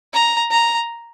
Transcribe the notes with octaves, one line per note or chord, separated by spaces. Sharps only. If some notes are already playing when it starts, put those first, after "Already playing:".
A#5
A#5